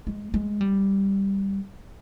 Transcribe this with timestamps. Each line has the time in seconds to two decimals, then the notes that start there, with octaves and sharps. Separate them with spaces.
0.07 G#3
0.34 G#3
0.61 G3